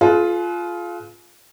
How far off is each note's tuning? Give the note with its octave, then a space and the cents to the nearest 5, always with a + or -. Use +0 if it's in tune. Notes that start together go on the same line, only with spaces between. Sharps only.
F4 +0 G#4 +45 B4 +0